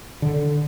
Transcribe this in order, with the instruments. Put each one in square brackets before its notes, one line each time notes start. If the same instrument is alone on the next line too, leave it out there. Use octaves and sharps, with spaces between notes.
[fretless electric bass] D3